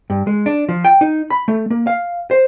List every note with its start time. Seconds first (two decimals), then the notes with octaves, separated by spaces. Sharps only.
0.10 G2
0.27 G#3
0.46 D4
0.69 F3
0.85 G5
1.01 D#4
1.30 B5
1.48 A3
1.70 A#3
1.87 F5
2.31 C5